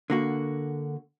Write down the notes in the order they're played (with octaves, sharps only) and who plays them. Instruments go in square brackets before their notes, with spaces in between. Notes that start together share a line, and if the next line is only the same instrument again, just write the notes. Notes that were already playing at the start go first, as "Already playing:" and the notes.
[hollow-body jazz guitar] D3 A#3 F#4